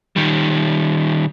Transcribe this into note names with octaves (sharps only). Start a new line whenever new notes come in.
D#3 G3